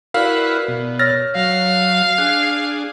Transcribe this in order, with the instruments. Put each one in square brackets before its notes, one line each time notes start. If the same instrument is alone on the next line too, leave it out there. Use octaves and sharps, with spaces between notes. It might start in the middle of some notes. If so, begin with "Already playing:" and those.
[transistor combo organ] E4 F#4 B4 [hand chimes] A#4 D5 [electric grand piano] F5
[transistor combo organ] B2
[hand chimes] C#5 E6 [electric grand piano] F6 A6 A#6
[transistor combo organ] F#3 [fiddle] F5
[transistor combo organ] D4 G#4 [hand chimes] F#6